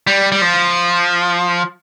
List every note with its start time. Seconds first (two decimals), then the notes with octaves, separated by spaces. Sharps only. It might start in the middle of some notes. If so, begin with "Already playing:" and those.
0.07 G3
0.32 G3
0.42 F3